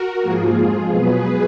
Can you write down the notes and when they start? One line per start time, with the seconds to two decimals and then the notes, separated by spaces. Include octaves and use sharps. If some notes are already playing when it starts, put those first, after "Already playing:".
Already playing: F#4 A#4
0.22 G#2 F3 A#3 F4 G#4
0.55 F2 F3 G#3
0.89 B2 F#3 B3 G#4 B4